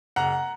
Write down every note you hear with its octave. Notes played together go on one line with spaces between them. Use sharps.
F#1 F#5 A#5